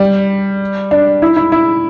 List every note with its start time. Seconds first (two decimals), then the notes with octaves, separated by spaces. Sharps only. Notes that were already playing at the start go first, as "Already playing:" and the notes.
Already playing: G3
0.91 D4
1.22 E4
1.36 E4
1.52 E4